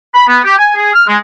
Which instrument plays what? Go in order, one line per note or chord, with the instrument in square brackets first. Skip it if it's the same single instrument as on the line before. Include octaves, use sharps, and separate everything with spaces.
[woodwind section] B5
B3
G4
G#5
G#4
F6
G#3